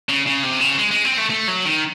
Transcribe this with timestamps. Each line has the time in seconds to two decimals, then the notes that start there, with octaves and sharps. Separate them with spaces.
0.09 C#3
0.26 C#3
0.43 C3
0.61 C#3
0.79 G#3
0.91 G#3
1.05 C4
1.18 A3
1.30 A3
1.48 F#3
1.65 D#3